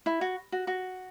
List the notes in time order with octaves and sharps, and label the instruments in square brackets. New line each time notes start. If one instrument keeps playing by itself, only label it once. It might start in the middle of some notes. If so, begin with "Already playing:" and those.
[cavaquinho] E4
F#4
F#4
F#4